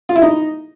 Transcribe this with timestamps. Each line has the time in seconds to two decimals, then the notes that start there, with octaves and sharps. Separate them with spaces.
0.09 F4
0.16 E4
0.22 D#4